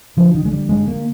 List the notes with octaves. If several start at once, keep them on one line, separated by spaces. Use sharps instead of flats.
D3 F3
D#3
D3 G#3
G3
G2 G#3
A#3